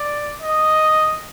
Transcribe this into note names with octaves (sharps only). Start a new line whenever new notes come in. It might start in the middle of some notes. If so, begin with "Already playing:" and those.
Already playing: D5
D#5